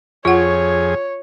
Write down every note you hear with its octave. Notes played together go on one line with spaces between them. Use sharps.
F2 F4 G#4 C#5 F#5